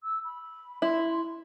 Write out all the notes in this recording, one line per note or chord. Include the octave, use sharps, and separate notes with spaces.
E6
B5
E4 C6